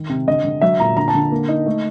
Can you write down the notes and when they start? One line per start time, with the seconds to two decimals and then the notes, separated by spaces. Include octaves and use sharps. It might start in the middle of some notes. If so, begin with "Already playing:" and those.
Already playing: D#3
0.09 C3
0.28 D3 D#5
0.45 D3
0.61 F#3 E5
0.79 A#2 A#5
0.97 D3 A#5
1.08 A5
1.15 D3
1.32 A#3
1.48 D#4
1.66 A3